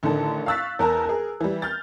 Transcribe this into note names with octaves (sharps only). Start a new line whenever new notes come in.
A1 D3 D#3 A4 A5
F5 C#6 E6 F#6 A6 B6
E2 A#4 A5 A#5
G#4 A#4
E3 G3
F6 G6 A6